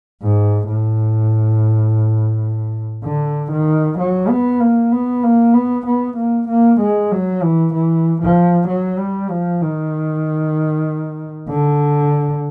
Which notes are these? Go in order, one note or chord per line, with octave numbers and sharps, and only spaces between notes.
G#2
A2
D3
D#3
F#3
B3
A#3
B3
A#3
B3
B3
A#3
A#3
G#3
F#3
E3
E3
F3
F#3
G3
F3
D#3
D3